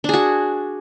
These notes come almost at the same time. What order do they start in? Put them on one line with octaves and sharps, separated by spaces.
D4 G#4 F#4